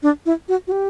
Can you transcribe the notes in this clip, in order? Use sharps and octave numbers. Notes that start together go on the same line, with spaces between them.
D4
E4
F#4
F#4
G4